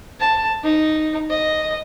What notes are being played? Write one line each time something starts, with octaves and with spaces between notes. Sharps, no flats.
A5
D#4
D#5